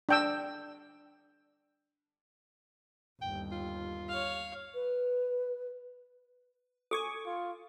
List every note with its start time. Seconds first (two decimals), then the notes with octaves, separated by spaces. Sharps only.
0.09 D4 G5 E6
3.22 G1 D#2 G5
3.52 F4
4.09 C#5 F5
4.75 B4
6.91 A4 G#5 C#6 D6
7.26 F4